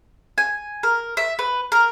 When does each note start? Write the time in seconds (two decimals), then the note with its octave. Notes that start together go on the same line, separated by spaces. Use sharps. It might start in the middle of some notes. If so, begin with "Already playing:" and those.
0.38 G#5
0.83 A#4
1.17 E5
1.39 B4
1.72 A#4